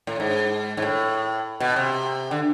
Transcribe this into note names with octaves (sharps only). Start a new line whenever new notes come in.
A2
G#2
G#2
A2
B2
C3
D3